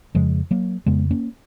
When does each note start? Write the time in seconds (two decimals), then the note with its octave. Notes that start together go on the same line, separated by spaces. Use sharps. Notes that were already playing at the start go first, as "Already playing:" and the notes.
0.15 F2 C#3 F3 G#3
0.51 F#3 A#3
0.86 F2 C#3 G#3 B3
1.11 A#3 C#4